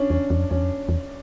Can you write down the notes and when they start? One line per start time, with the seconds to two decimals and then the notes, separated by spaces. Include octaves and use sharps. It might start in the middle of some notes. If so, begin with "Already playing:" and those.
Already playing: C#4 D4
0.10 E2 C#4
0.30 E2
0.37 F2
0.50 E2 C#4
0.63 F2
0.89 E2